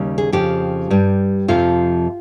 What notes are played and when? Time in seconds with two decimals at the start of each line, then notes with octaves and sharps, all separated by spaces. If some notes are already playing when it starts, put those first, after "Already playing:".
Already playing: D#2 C#3 G3
0.18 G#4
0.32 F2 C#3 F3 G4
0.90 G2 G3
1.48 F2 C3 F3 F4